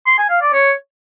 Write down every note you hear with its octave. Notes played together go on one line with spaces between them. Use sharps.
C6
G#5
F5
D5
C#5